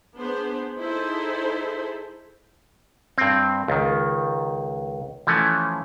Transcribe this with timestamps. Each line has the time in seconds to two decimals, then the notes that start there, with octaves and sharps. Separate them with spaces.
0.16 B3 D4 G#4 C5
0.80 D#4 E4 G#4 A4 C5
3.18 G2 C4
3.68 C#2 D#3
5.27 E3 F3 A3 C#4